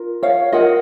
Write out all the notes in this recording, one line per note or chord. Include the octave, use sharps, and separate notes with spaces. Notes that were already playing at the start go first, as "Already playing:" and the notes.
Already playing: F4 A#4
C#5 F5
F4 A#4 D#5 F#5